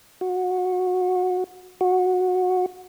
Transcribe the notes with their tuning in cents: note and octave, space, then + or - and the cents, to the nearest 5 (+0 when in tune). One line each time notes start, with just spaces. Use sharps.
F#4 -20
F#4 -15